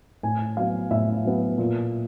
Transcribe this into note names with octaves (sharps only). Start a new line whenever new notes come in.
A2 G#5
F#3 B3 F5
A2 E5
F#3 B3
A#2